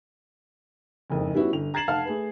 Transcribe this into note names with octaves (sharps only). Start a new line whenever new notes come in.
F#1 F2 G#2
G3 B3 C#4 E4 F#4
G1 F7
A#5 G#6 A6 C7 E7 F#7
F1 F5 F#5 A5 F6
A3 G#4 B4